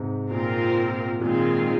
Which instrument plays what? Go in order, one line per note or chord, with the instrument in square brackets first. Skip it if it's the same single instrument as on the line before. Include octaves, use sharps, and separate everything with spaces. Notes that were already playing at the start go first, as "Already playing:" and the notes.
Already playing: [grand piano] G#2 C3
[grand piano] A#2 [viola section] C4 F4 A#4
[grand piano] A#2 [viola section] D#3 G#3 C4 F4 G#4